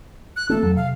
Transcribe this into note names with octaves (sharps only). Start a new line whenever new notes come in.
F#6
A3 A#3 C4 A4
F2 F#3
C3 F5